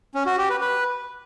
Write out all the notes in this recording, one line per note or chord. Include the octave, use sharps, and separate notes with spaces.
C#4
F#4
G4
B4
B4